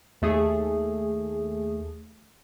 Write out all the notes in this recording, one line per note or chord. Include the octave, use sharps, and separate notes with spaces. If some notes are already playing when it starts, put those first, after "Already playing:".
D#2 A3 G#4